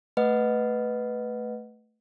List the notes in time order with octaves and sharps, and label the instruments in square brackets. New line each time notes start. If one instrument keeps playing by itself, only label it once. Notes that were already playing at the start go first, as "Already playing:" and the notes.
[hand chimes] A3 B4 D#5 F#5